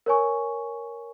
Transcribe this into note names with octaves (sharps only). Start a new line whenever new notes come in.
A#4 C#5 G#5 C#6